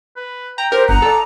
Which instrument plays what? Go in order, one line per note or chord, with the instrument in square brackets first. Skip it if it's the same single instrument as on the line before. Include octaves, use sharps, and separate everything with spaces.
[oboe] B4
[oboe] G5 [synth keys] A#5
[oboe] G4 [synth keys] A#4 [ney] C5
[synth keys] G1 [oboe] F#5 [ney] A#5
[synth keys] A4 D5